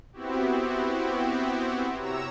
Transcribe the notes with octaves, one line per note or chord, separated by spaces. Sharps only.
B3 C4 E4 F#4 G4
C3 C#5 A#5 E6 E7